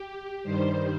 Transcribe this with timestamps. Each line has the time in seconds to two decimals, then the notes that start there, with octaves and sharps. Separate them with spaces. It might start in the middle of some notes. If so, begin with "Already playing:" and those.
Already playing: G4
0.43 G2 D#3 G3 C5